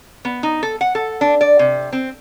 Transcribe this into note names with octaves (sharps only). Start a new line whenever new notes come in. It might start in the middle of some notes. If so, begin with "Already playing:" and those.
B3
D#4
A4
F#5
A4
D4
D5
C3
C4